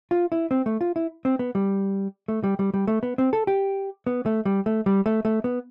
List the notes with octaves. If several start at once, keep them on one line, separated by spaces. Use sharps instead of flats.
F4
E4
C4
A3
F4
E4
C4
B3
G3
A3
G3
G3
G3
A3
B3
C4
A4
G4
B3
A3
G3
A3
G3
A3
A3
B3